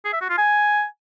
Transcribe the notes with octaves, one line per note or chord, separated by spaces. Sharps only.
G#4
E5
F#4
F4
G#5